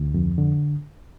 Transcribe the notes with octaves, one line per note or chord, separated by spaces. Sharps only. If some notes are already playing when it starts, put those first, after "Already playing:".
Already playing: D2
F2
D3